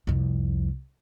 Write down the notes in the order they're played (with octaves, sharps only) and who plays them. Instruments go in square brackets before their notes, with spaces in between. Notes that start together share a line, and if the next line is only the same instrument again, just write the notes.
[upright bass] C2 F2